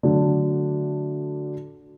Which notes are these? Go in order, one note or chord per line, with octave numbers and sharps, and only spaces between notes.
D3 F#3 A3 D4